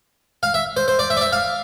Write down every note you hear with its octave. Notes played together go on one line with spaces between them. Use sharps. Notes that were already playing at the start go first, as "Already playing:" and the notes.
F5
E5
C5
C5
D5
E5
D5
E5
F5